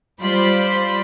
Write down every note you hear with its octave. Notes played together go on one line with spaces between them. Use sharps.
G3 F4 C5 D5 B5 C6